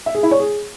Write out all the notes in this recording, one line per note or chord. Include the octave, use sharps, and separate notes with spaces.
E5
G#4
E4
C#5
G#4